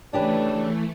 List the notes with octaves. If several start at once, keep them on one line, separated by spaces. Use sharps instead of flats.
C#3 E3 A3 D4 G4 B4